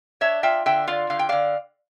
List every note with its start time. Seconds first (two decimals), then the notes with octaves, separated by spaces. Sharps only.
0.21 D4 C#5 E5
0.43 F4 E5 G5
0.66 D3 E5 G5
0.87 F4 D5 F5
1.10 D3 F5
1.19 G5
1.29 D3 D5 F5